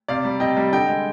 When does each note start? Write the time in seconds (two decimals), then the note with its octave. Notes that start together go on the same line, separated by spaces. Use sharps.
0.08 C3 D5 F5
0.24 G3
0.40 C3 D#5 G5
0.57 G3
0.72 D3 D#5 G5
0.88 G#3